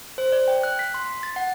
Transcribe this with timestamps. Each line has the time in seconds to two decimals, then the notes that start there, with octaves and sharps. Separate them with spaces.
0.18 C5
0.32 D5
0.48 G5
0.63 F#6
0.79 B6
0.94 C6
1.23 A6
1.36 F#5